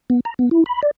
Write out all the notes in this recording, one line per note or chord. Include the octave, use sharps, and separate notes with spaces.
B3
A#5
B3
E4
B5
D5